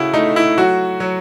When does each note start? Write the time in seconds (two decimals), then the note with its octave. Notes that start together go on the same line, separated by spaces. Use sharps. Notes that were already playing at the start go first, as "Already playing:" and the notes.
Already playing: C#3 A3 E4 F#4
0.14 A3 D#4
0.36 E4
0.58 F#3 F#4
1.00 F#3